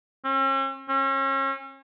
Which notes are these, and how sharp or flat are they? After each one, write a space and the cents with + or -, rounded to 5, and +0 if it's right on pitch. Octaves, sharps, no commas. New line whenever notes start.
C#4 -45
C#4 -35